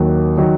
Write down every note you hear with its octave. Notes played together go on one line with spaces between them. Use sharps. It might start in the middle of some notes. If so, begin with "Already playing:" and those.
Already playing: D#2 D#3 F#3
D#3 F#3